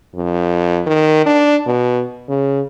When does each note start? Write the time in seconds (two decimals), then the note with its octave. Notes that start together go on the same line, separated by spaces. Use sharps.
0.15 F2
0.87 D#3
1.26 D4
1.66 B2
2.29 C#3